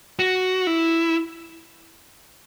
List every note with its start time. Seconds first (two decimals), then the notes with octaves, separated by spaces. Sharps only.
0.19 F#4
0.67 E4